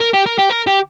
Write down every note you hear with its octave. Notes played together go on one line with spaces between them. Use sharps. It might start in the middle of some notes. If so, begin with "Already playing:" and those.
A#4
G4
A#4
G4
A#4
G4